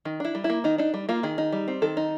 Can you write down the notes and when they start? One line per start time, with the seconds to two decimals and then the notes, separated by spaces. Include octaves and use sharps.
0.05 D#3
0.20 D4 E4
0.35 G3
0.44 E4
0.50 A#3
0.64 D#3 D#4
0.78 D4 D#4
0.94 G3
1.09 A#3 F4
1.23 D#3 G#4
1.38 D#4
1.52 G3
1.68 C4
1.82 D#3 A4
1.97 D#4